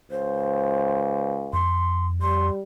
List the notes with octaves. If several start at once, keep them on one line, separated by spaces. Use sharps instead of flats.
C#2 C5
F2 C6
G3 C6